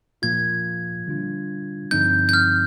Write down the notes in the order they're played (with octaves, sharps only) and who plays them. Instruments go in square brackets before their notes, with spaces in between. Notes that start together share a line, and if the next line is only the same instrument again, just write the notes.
[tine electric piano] A#2 F3 A#3 F4 [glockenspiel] G#6
[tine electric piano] D3 G3 D4 F4
[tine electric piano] G2 D3 F3 C4 D#4 [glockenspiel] G6
[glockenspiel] G6
F6